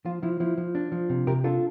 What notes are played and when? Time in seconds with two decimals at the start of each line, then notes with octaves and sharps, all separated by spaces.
0.05 F3 F4
0.23 F3 E4
0.40 F3 E4
0.57 F3
0.75 D4
0.92 F3
1.09 C3
1.27 C3 G4 A#4
1.44 D4 F4 A4